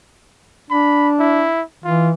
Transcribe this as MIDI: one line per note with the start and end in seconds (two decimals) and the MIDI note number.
0.71 1.48 62
0.71 1.09 83
1.19 1.62 64
1.84 2.13 52
1.84 2.10 65